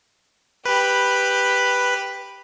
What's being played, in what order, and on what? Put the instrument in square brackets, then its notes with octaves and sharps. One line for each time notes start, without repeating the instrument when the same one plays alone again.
[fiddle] G4 B5 [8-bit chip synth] B4